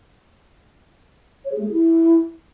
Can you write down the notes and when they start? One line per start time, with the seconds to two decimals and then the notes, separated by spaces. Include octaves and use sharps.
1.45 C#5
1.52 G#4
1.58 A3
1.65 G#4
1.72 E4